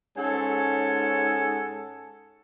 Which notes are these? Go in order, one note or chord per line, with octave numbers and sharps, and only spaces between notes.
G#2 C#4 A4 F#5 G#5